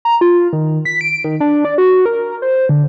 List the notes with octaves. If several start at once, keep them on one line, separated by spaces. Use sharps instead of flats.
A#5
F4
D#3
B6
D7
D#3
D4
D5
F#4
A#4
C5
D3